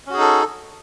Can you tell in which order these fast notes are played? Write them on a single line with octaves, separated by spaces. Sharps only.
C#4 F#4 G#4 D#4 A4